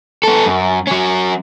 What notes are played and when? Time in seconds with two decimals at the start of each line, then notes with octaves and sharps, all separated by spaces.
0.24 B3 A4
0.46 F#2
0.87 F#3 C#4